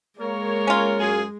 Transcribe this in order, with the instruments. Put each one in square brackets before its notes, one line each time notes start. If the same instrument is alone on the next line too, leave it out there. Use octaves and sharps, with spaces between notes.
[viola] G#3 [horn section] A#3 A#4 C#5
[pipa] C#4 F4
[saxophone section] F#2 G#4